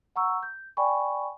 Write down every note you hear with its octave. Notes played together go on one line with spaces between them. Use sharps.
F#5 A#5 C#6 E6
G6
D5 G5 G#5 B5 C#6